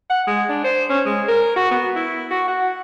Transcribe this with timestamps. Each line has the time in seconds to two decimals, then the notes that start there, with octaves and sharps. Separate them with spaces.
0.10 F#5
0.27 G#3
0.49 D4
0.64 C5
0.90 C#4
1.06 G#3
1.28 A#4
1.56 F#4
1.71 B3
1.96 E4
2.31 F#4
2.48 F#5